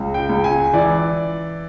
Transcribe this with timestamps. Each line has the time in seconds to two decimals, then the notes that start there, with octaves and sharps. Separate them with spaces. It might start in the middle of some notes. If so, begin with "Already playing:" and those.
Already playing: C#2
0.14 G5
0.29 C#2
0.44 G#5
0.73 E3 D5